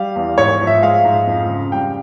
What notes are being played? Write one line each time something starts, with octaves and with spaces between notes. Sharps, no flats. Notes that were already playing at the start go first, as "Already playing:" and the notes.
Already playing: G3 F5
E2
G#2 C#5
F3
E5
G#3 F5
G#2
F2
C#3
G3 G5